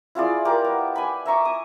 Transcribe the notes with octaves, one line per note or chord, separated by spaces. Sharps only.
E4 F4 G#4 D5
G4 A#4 D6
B3
G#5 B5
E5 A#5 C#6 D6
D#6